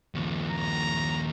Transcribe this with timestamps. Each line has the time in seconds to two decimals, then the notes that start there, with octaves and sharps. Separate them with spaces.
0.15 D#2 F3
0.49 A#5